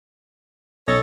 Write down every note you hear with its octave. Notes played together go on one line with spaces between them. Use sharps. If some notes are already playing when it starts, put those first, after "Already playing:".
B1 A4 C#5 D#5 A#6